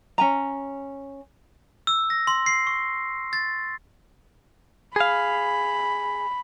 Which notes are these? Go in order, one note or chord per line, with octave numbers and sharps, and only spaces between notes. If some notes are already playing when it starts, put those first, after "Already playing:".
C#4 G#5 A#5
E6
A#6
C6
C7
C#6
A6
G#4 F5 B5